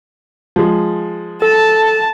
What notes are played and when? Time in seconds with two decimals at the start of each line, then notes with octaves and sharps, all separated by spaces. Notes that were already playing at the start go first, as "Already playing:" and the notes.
0.56 F3 G#3
1.42 A4 A5